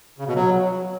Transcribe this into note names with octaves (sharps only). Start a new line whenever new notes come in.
C#3
B2
F#3